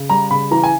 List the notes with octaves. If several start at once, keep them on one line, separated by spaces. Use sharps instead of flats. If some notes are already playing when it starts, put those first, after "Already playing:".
Already playing: C#3
G3 A#5
C#3 B5
E3 A#5
G#5